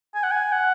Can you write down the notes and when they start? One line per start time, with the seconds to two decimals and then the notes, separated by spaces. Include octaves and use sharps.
0.15 G#5
0.23 F#5
0.31 G#5
0.52 F#5